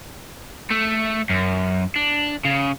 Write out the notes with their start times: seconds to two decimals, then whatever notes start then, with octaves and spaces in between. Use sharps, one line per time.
0.70 A3
1.30 F#2
1.96 D4
2.45 C#3